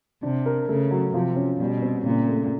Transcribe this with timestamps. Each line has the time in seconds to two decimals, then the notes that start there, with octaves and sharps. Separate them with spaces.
0.22 C3 D4
0.46 A#4
0.69 C#3 A3
0.91 F#3
1.14 C3 F3
1.36 C#4
1.59 B2 G3
1.82 C4
2.05 A#2 C#3
2.28 A3